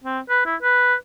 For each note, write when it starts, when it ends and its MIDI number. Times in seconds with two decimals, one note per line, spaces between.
0.04 0.19 60
0.29 0.42 71
0.46 0.56 64
0.62 0.95 71